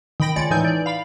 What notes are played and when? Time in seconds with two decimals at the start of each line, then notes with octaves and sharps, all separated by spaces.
0.20 D#3 G5 B5 A#6 D7
0.36 C#2 G#3 D5 A6 C#7
0.50 A2 E3 D#4 G#5 G6
0.65 D5
0.86 F5 B5